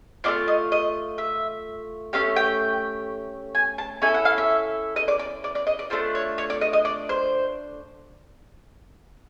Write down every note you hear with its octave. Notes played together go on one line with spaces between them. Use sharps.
A3 D4 F4 D5
D#5
D#5
E5
A3 C#4 G4 F5
G5
G#5
A5
C#4 E4 A4 G#5
F#5
F5
E5
D#5
D5
D5
D5
D5
D#5
D5
A3 D4 F4 C5
C#5
C#5
D5
D#5
D#5
D5
C5